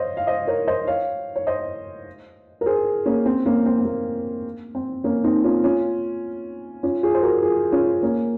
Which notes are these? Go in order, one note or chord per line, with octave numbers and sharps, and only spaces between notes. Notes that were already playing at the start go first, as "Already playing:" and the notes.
Already playing: C5 C#5 D#5 F5
F5
C5 D#5
A#4 C#5
C5 D#5
C#5 F5
C#5
C5 D#5
A#4
G#4 C5
A#3 C#4
C4
A#3 C#4
C4
C4
A#3
C4
A#3 C#4
C4 D#4
C#4 F4
C#4 F4
C#4 F4
F4 G#4
C5
F#4 A#4
F4 G#4
C#4 F4
A#3 C#4